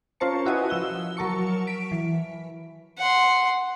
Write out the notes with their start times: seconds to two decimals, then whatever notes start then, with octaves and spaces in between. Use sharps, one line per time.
0.20 C#4 F4 A#4 C5 A5 C#7
0.46 E4 F#4 B4 D#5 G#5 D#6
0.70 F3 E6 G7
1.17 F#3 A#4 A5 C#6 C#7
1.67 B6 D7
1.92 E3
2.98 F#5 C6